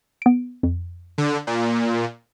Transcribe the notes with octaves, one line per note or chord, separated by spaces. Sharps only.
B3 D7
F2
D3
A#2